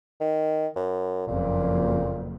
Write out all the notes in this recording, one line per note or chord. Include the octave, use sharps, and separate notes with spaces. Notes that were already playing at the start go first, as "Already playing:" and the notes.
D#3
F#2
F#1 F2 A#2